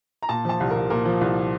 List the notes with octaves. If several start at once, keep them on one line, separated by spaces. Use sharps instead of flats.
A#5
A#2 A5
F3 A5
C2
C2 A#4
A#2 A#4
F3
C2